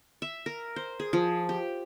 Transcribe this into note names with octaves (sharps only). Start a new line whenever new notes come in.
E5
A#4
C5
G#4
F3
G4